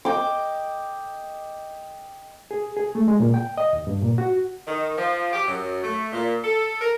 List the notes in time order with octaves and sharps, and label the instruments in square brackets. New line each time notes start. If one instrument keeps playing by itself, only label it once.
[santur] D#5 G5 D6
[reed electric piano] G#4
G#4
A3
G#3
A#2
G5
D#5
D#2
G2
A#2
F#4
[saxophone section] D#3
F3
G4
F#2
A3
A#2
A4
A#4